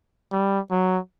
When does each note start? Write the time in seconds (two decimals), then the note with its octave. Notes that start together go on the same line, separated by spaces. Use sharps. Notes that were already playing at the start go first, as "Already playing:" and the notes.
0.32 G3
0.71 F#3